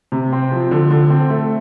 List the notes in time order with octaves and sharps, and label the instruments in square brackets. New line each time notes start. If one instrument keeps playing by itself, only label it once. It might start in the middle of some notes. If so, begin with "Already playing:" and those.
[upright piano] C3
C4
F3
D3
D3
C4
A3